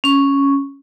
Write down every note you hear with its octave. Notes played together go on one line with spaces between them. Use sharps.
C#4 C#6